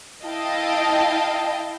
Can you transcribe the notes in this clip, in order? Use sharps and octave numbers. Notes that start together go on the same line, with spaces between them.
E4 D#5 F5 G5 A5